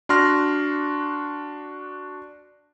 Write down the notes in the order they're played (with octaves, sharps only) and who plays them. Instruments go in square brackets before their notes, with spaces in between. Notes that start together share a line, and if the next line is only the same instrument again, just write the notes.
[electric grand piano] D4 F#4 C6 F6 A#6